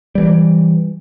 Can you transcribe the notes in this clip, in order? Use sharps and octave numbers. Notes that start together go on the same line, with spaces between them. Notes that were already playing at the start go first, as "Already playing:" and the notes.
E3 G3